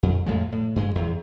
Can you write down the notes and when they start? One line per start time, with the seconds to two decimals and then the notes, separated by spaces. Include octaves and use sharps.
0.03 F2
0.26 F2 A2 F3 G#3
0.52 A2
0.76 G2 G#3
0.95 E2